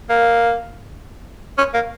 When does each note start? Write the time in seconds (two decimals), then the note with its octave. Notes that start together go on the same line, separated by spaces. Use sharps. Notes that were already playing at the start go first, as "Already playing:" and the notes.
0.10 A#3
1.58 C#4
1.74 A#3